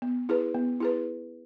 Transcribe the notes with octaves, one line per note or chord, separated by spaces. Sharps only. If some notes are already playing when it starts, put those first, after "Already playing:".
B3
E4 G#4 B4
B3
E4 G#4 B4